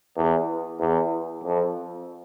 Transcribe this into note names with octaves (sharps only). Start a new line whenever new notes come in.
E2
E2
F2